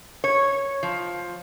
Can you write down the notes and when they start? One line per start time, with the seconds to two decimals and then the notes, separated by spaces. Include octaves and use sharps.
0.24 C#5
0.83 F3